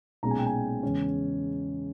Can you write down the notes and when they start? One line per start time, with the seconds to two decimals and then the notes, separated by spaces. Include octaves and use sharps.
0.23 B1 A#2 G#3 C#4 A#5
0.31 G#5
0.38 G5
0.46 G#5
0.83 E2 C#3 G#3 C#4